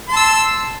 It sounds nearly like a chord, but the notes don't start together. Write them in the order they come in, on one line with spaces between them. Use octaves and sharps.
C6 A5 E6